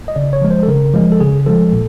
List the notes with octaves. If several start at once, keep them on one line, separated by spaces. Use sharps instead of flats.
D#5
C#3 D5
C#5
F3 G#3
C5
A4
C#3 A#4
F3 G#3
A4
C#3 G#4
F3 G#3 A4
A#2